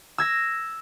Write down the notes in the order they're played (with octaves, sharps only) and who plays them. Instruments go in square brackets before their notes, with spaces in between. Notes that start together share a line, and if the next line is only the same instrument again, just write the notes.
[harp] E6 G#6 A#6